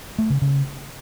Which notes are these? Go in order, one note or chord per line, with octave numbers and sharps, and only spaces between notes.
A3
C#3
C#3